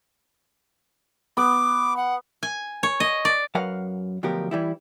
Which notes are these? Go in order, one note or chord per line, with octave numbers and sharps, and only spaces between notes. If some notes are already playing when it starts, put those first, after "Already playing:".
B3 D6
F#5
G#5
C#5
D#5
D5
F#2 F#3 A#4 B4 F5 F#5
D2 B2 F3 F#3 G4 A#4
E3 G3 E4